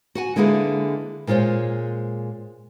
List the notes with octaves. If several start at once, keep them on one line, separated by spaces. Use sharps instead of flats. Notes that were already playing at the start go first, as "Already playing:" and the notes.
F#4 F#5 G#5
D3 G#3 A#3 E4 G#4 B4
A#2 G#3 F4 C5 C#5